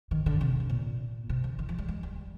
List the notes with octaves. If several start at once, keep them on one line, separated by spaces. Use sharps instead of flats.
D#3
D3
C3
C3
A#2
C3
D3
D#3
F3
G3
G#3
G3